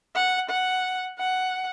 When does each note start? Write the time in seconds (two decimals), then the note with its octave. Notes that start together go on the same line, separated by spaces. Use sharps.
0.15 F#5
0.50 F#5
1.19 F#5